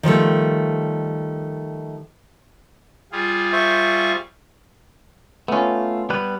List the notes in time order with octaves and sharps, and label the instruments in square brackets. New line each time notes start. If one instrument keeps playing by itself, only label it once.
[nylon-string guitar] D#3 F3 G3 A3
[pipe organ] G3 F4 G#4
[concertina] C5 E5 C#6
[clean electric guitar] A3 F4 [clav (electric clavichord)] B3 C#4
[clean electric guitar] G3 B3 B4